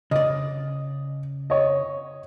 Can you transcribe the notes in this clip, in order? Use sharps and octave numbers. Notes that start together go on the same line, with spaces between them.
C#3 D5 D#5
C#5 D#5